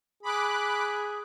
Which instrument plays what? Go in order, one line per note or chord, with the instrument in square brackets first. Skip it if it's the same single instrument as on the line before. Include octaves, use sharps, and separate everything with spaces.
[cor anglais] G#4 [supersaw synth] B5 D6 F#6